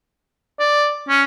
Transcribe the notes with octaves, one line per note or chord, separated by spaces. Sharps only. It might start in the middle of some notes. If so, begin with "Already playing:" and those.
D5
C#4